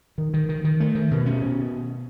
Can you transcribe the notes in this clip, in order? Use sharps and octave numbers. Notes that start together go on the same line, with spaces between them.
D#3
D#3
D#3
D#3
A3
D#3
B2
C#4
B2